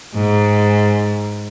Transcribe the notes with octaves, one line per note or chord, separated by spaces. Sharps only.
G#2